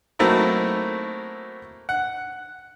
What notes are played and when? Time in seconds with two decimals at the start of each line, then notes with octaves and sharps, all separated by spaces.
0.19 F#3 A3 A#3 C4 D#4 E4
1.89 F#5